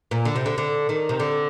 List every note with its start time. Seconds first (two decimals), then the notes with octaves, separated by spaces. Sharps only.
0.11 A#2
0.25 D3
0.36 C3
0.46 D3
0.58 D3
0.89 D#3
1.09 C3
1.20 D3